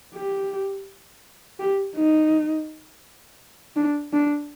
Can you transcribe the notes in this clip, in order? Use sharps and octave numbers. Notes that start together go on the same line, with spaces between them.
G4
G4
D#4
D4
D4